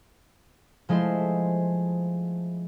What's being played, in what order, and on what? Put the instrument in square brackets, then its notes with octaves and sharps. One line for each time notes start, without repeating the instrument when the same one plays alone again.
[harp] F3 G#3 A3 E4 C5